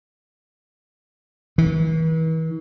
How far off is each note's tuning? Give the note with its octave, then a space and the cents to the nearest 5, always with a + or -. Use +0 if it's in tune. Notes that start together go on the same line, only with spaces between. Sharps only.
E3 -40